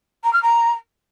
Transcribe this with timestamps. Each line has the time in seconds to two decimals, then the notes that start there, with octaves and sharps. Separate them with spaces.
0.24 A#5
0.33 F6
0.43 A#5